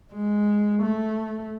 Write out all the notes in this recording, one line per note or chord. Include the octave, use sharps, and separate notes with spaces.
G#3
A3